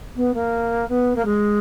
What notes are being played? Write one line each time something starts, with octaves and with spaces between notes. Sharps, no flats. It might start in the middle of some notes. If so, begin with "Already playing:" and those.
B3
A#3
B3
A#3
G#3